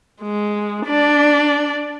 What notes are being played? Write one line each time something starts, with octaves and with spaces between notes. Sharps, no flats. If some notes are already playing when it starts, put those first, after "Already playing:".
G#3
D4 D5